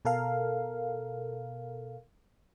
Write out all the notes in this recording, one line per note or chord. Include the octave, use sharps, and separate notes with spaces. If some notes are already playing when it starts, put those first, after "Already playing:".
B2 A4 A#4 F5